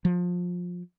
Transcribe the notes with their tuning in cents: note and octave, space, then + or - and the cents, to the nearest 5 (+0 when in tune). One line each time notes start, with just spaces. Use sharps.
F3 +25